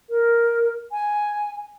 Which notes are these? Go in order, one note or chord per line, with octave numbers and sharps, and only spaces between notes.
A#4
G#5